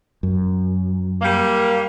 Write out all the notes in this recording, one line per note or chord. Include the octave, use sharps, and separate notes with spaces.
F#2
G3 A#3